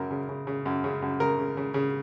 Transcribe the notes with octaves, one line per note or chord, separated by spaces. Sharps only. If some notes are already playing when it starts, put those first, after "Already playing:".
Already playing: F#2 C#3 A#4
C#3
C#3
C#3
F#2
C#3
F#2
C#3 A#4
C#3
C#3
C#3